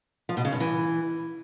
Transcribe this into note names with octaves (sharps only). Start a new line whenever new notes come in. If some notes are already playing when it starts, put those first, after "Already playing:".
F3
B2
C#3
G2
E3